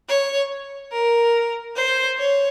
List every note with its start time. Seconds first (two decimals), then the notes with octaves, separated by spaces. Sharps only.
0.09 C#5
0.92 A#4
1.76 C5
2.18 C#5